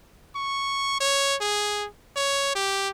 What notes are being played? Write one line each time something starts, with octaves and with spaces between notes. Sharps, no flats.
C#6
C#5
G#4
C#5
G4